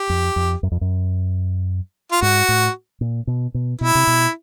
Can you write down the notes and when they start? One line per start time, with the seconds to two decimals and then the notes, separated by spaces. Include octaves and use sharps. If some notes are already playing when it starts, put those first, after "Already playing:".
Already playing: G4
0.09 F2
0.36 F2
0.63 F#2
0.72 F2
0.81 F#2
2.12 F4
2.22 G#2 F#4
2.48 A2
3.01 A#2
3.27 B2
3.54 B2
3.81 B2 E4
3.95 C3
4.07 B2